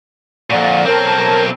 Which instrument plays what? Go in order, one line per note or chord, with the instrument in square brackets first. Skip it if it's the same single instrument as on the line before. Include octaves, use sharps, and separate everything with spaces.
[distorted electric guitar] F2 A#2 [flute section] D5 F5 F#5
[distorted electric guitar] B1 C4 [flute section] A#4 C#5 A5